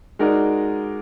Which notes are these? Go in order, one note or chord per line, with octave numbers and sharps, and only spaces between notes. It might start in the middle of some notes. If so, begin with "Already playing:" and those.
G#3 D#4 F#4 A#4 D5